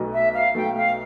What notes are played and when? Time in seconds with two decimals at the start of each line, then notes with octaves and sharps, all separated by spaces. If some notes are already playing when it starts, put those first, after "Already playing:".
Already playing: B1 B2 A3
0.13 E5
0.34 F5
0.55 B1 B2 A3 G5
0.76 F5